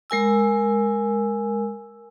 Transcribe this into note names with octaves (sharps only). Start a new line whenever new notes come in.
G#3 A#4 G#5 E6